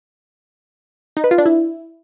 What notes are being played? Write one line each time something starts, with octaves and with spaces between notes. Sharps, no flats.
D#4
B4
F4
D4
E4